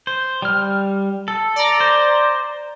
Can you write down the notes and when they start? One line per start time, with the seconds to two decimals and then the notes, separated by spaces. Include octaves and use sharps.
0.07 C5
0.42 G3 F6
1.28 A4
1.56 D5 A#5
1.80 C5